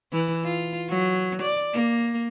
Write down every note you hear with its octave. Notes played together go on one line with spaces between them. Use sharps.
E3
F4
F#3
D5
A#3